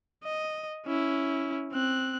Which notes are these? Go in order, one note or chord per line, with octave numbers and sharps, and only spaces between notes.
D#5
C#4 E4
C4 F#6